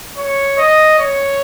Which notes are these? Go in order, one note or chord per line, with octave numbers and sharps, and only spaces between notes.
C#5
D#5
C#5